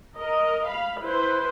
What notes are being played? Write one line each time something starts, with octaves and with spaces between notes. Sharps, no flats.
A#4 D#5
F5 B5
E4 B4 C5